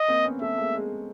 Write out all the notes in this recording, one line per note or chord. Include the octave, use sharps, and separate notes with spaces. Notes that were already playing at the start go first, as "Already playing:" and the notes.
Already playing: D#5
A#3 C4
B3 C#4
A3 B3 E5
G#3 A#3
G#3